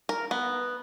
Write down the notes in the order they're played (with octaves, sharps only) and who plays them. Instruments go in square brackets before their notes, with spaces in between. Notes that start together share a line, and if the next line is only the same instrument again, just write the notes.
[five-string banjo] A#4
B3